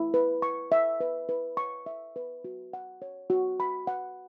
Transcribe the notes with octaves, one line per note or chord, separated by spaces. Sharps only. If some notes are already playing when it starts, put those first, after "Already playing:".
Already playing: E4
B4
C#6
E5
B4
B4
C#6
E5
B4
F#4
F#5
C#5
F#4
B5
F#5